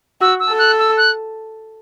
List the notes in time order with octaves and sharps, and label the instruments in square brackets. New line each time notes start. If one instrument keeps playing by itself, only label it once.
[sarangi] F#4 [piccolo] E6
[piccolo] E6
[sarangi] A4
[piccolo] F#6
E6
F#6